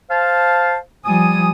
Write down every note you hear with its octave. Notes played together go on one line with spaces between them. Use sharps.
C5 F5 A5
F3 G3 G#5 D#6